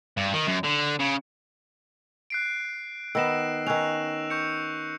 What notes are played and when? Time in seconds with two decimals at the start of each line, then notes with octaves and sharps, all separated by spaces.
0.17 G2
0.33 D#3
0.48 F#2
0.64 D3
1.00 C#3
2.30 F#6 C7 D7
3.15 D#3 B3 E6 A#6 E7
3.67 D#3 C#4 E6 F#6 F7
4.30 C#6 G6 C#7